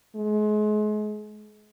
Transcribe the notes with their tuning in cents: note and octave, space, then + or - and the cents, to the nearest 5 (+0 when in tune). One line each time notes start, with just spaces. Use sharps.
G#3 +35